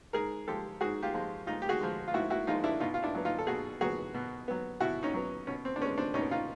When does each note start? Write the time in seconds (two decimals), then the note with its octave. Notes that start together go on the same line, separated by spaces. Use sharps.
0.13 G#2 G#4 A#4
0.48 F3 G#3 G4 A4
0.81 G#2 F#4 G#4
1.02 F4 G4
1.14 F3 G#3
1.47 G#2 D#4 F4
1.62 G4
1.69 F#4 G#4
1.80 F3 G#3
2.08 F4
2.14 G#2 E4 F#4
2.30 E4 F#4
2.47 F3 G#3 D#4 F4
2.64 D4 E4
2.80 B2 D#4 F4
2.94 F4
3.03 D4 E4
3.15 F#3 B3
3.25 D#4 F4
3.39 A4
3.47 B2 F#4 G#4
3.81 F#3 B3 F#4 G#4
4.14 B2
4.48 F#3 B3
4.80 B2 E4 F#4
5.03 C#4 D#4
5.14 F#3 B3
5.47 B2 C#4
5.65 C4
5.76 D4
5.81 B3 C#4
5.85 G#3
5.98 C4 D4
6.14 B2 C#4 D#4
6.31 D#4 F4